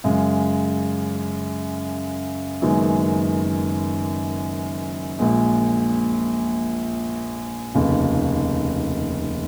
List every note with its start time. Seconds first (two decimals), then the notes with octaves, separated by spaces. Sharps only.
0.04 F#2 C#3 G#3
2.62 F#1 F#2 D#3 G#3 B3
5.19 A#1 A#2 G#3
7.75 F1 D#2 C#3